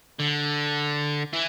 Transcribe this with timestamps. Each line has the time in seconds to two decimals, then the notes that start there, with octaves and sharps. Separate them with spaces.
0.20 D3
1.33 E3